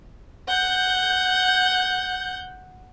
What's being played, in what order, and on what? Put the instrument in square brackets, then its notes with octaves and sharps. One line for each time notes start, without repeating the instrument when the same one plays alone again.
[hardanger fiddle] F#5 [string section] G6